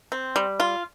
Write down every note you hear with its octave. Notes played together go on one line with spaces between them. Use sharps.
C4
G3
F4